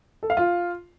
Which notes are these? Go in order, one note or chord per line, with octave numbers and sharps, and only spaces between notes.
A4
F5
F4